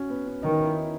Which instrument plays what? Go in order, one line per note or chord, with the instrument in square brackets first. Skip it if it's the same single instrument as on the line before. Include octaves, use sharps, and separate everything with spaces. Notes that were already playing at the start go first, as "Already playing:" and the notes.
Already playing: [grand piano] C#4 F#4
B3
C#4
[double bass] D#3 [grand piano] D#4
[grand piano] E4